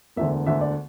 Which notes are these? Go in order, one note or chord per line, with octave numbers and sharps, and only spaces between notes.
E1 D2 D3 E5
E1 D2 D3 E5
D5